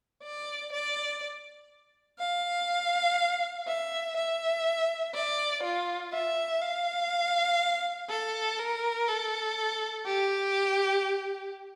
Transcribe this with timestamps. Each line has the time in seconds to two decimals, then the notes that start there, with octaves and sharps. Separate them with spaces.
0.23 D5
0.73 D5
2.19 F5
3.67 E5
4.16 E5
5.14 D5
5.63 F4
6.13 E5
6.61 F5
8.10 A4
8.59 A#4
9.08 A4
10.05 G4